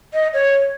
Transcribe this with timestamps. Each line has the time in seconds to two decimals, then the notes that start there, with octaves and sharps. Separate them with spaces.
0.13 D#5
0.34 C#5